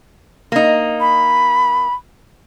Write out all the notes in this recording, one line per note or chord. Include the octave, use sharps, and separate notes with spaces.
A#3 D#4
B5